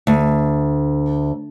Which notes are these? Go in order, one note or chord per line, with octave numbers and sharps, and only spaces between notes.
D2